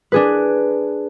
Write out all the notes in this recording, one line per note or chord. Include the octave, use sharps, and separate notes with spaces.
D4 G#4 B4